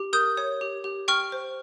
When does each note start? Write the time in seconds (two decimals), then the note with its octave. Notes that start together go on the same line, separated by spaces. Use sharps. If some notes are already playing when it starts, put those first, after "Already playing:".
Already playing: G4
0.13 A#4 D#6 G6
0.37 C#5
0.61 G4
0.84 G4
1.08 G5 C#6 F6
1.32 C5